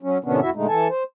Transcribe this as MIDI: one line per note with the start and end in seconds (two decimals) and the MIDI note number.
0.03 0.18 54
0.03 0.18 61
0.24 0.40 45
0.24 0.40 48
0.24 0.40 51
0.24 0.40 59
0.24 0.40 61
0.24 0.40 62
0.41 0.50 41
0.41 0.50 64
0.41 0.50 66
0.41 0.50 76
0.55 0.67 46
0.55 0.67 50
0.55 0.67 56
0.55 0.67 57
0.55 0.67 63
0.68 0.88 52
0.68 0.88 69
0.68 0.88 80
0.68 0.88 81
0.89 1.03 72